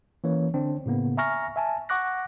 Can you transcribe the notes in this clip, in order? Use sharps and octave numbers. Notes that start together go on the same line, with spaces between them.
E3 A#3 C#4 C#5
D3 C4 D4
A2 C#3 A#3 B3
E5 G#5 A#5 C#6 F6 A#6
E5 G#5 A5
F#5 C#6 D6 F#6 A#6